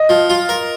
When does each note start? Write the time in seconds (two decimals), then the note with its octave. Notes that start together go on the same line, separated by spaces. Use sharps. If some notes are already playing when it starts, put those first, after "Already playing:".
Already playing: D#5
0.09 F3
0.30 F4
0.49 A#4